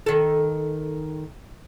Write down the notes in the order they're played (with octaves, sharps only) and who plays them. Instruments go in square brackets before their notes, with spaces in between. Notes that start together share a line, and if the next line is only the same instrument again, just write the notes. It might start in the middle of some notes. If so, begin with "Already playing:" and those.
[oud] D#3 A4